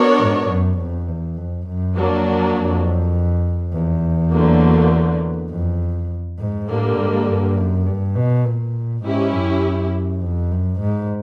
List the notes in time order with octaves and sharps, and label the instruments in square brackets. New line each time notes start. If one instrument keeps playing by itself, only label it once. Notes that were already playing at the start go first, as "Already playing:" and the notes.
Already playing: [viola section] B3 D4 F#4 A#4 C#5
[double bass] G#2
F#2
F2
E2
F2
F#2
[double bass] F2 [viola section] F#3 A#3 D4
[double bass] F2
E2
[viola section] D3 F#3 A#3
[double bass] F2
G#2
[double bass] A2 [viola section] D3 G3 A#3
[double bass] G#2
G2
F#2
G2
B2
A#2
[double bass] G#2 [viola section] C#4 E4 G4
[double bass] F#2
F2
F#2
G#2